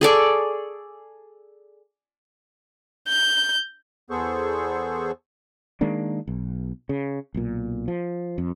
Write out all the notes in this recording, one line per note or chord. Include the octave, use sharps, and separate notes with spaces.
G#4 A4 D5 C#6
G6
E2 B3 G#4 A4 C5 C#6
D#3 G#3 A#3 D4
B1
C#3
B1 A#2
F3
F2